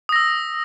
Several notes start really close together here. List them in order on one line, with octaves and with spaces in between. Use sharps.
D#6 A#6 E6